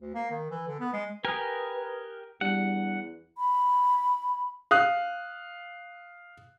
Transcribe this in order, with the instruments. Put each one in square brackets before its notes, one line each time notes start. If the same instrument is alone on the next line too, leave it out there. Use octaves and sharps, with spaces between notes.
[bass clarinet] D2
A#3
D#3
E3
D3
B3
G#3
[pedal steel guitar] G4 A#4 G#5 [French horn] B4 [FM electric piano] D#6 F6 F#6
[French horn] E2 [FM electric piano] G3 D4 [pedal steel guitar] F#5
[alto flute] B5
[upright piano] F5 D#6 F#6